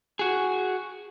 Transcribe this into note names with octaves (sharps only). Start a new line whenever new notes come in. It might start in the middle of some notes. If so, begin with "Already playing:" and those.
F#4 G#4